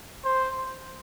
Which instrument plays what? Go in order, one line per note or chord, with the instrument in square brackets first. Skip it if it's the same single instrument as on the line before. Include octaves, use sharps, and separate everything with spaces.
[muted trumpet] C5